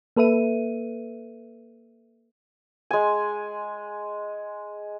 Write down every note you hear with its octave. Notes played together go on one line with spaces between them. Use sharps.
A#3 A4 B4 E5 D#7
G#3 G#5